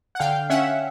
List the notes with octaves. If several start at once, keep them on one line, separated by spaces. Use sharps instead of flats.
F#5
D3 F5 G5
C#4 E5 F#5